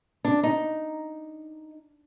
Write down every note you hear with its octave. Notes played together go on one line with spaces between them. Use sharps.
D4
D#4